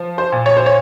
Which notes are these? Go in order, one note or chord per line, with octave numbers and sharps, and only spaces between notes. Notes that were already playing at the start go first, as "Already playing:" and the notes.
Already playing: F3
C5
A#2
C#5
C5
C#5